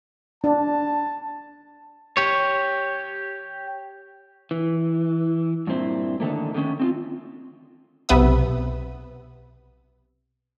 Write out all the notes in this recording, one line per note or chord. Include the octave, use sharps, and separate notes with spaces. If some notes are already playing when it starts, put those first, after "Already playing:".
D4 A5
G4 C#5
E3
G2 A#2 C4 E4
D3 D#3 A3 A#3
D3 D#3 A3 C#4
C4 D#4 F4
B1 C3 B3 B4 E5 D#6